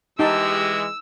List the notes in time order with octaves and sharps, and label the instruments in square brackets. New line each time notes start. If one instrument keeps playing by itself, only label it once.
[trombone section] E3 G#3 [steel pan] D#4 A5 [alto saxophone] G4 [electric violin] E6